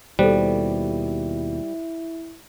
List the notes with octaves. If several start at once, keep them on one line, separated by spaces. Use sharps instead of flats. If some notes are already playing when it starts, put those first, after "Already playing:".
D#2 B2 G3 E4 A4 C5